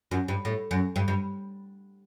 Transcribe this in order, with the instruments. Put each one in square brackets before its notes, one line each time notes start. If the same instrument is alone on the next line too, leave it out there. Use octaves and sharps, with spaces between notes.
[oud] F#2
G2
A2
F#2
G2
G2